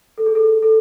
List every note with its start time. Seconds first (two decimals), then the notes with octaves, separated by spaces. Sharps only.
0.18 A4
0.26 G#4
0.35 A4
0.62 A4